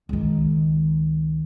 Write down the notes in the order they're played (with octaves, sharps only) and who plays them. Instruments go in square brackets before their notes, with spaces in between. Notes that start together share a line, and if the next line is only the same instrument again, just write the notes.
[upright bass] C#2 D#3